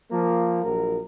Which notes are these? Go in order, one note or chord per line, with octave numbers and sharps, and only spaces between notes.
F3 A#3
A#1 F#3 A#4